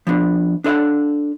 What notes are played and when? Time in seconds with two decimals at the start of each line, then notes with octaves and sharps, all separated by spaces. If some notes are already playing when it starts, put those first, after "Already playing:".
0.07 F3 B3 D4
0.64 D4 A4 D#5 F5 F#5